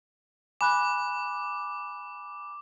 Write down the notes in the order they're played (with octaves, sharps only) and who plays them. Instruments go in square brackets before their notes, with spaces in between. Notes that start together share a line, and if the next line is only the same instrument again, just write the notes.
[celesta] G#5 B5 F#6 [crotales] D6